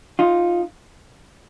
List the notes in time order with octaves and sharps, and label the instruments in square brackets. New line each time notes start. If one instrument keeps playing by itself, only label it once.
[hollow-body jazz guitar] D#4 F4